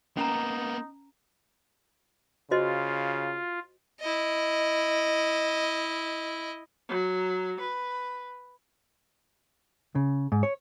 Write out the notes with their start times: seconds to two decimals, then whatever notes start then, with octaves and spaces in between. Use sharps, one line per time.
0.17 A#3 B3 C#4 D#4 A5 A#5
2.51 C#3 F4 F#4 C5 D#5
4.00 E4 D#5
6.89 F#3
7.60 B4
9.95 C#3
10.32 G#2
10.43 C#5